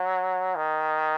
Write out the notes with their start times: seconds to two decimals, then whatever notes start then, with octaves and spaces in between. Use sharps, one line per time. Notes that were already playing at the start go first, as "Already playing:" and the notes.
Already playing: F#3
0.56 D#3